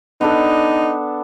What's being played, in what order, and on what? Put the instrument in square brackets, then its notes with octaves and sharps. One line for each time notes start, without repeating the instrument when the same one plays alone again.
[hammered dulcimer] B3 D4 A4 [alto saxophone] D#4